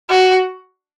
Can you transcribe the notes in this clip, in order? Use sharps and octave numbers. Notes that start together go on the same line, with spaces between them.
F#4